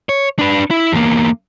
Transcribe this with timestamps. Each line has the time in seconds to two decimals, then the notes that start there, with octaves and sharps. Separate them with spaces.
0.09 C#5
0.39 D4 B4
0.71 E4
0.92 E2 A#3